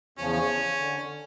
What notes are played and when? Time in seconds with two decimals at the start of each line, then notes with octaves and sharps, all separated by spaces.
0.18 E2 C#3 F3 C#4
0.33 C#4
0.78 D3